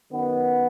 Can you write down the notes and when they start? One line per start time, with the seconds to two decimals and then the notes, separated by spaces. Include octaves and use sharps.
0.10 F#2 D#3 B3